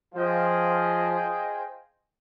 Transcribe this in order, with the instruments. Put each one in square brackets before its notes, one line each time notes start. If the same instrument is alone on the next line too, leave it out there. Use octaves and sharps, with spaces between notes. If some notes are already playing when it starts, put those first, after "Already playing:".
[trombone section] F3 [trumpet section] F4 G#4 C5 D#5 G5